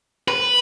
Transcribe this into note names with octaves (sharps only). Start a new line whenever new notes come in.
B4